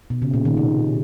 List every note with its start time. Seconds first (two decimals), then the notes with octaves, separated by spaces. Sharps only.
0.10 B2
0.22 C#3
0.34 A#2
0.45 D#3
0.57 C3